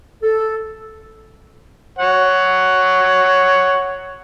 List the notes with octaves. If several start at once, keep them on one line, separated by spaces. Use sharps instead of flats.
A4
C#5 F#5